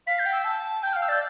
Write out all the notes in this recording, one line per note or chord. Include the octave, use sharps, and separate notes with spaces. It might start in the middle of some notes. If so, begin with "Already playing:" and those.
F5 B6
G6
G5
E6
A5
G5 G6
F5 F6
E6
D5 G6